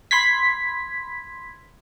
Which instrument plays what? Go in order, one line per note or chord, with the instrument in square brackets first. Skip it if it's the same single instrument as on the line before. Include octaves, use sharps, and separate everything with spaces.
[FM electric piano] B5 C6 G#6 B6